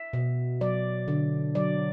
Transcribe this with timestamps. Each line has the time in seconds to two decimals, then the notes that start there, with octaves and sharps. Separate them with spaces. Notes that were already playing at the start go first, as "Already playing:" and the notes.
Already playing: E5
0.13 B2
0.61 F#3 D5
1.08 D3
1.55 F#3 D5